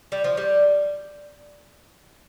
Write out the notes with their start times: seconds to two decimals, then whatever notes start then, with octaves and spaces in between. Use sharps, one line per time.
0.12 G3
0.24 F3
0.37 G3